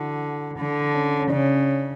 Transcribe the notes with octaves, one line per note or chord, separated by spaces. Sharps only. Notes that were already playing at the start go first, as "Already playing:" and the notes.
Already playing: D3 E4 F#4
D3
C#4
C#4
C#3 D4